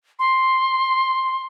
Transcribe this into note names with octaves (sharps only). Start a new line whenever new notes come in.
C6